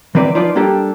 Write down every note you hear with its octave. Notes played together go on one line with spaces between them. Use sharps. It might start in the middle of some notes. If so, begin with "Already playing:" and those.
E3 F#3 C4 B4 D5
F3 D#4 F4 B4 D5
G3 A#3 D4 G4 A4